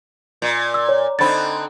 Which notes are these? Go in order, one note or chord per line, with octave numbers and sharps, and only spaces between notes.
A#2
E6
C#5
D3 C4 D#4 B5 A6